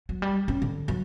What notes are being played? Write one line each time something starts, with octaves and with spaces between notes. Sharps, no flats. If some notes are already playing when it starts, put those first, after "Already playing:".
F#3
G3
C#4
D3
F#3